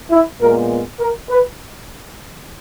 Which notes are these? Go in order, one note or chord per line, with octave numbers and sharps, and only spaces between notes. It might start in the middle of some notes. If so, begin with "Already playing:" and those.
E4
A#2 G#3 B3 A#4
A#4
B4